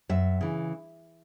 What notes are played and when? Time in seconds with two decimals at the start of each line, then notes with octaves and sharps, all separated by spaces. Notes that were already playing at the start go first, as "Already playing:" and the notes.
0.09 F#2 E5
0.41 C#3 E3